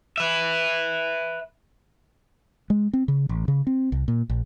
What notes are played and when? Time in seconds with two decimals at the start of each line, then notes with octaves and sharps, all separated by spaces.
0.18 B4 E5
2.70 G#3
2.93 C4
3.08 C#3
3.29 A1
3.48 C#3
3.67 C4
3.92 C2
4.08 A#2
4.30 A#1